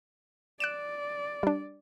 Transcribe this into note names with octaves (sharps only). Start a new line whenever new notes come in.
D5 F#6 D7 E7
G3 D4